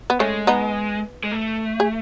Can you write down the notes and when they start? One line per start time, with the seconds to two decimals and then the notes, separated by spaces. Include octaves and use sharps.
0.10 B3
0.20 G#3 A3 C#4
0.47 B3 D#4
1.23 G#3
1.32 A3
1.80 G#4